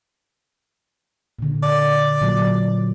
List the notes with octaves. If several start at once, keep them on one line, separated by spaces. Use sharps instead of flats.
A#2 D3
D5
A#2 F#3